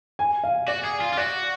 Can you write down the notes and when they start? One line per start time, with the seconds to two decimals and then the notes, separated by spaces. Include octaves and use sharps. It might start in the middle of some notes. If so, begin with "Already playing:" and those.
0.19 G#5
0.44 F5
0.68 F#4 D5
0.84 G#4
1.01 F4
1.13 F4
1.17 F#4 D5